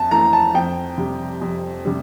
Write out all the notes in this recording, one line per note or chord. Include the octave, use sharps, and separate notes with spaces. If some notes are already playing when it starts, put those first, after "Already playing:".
Already playing: F2 A5
E3 A3 A#5
A5
F2 G5
C3 G3
F2
C3 G3